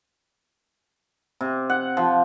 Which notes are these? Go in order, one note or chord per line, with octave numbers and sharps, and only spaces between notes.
C3
F#5
F3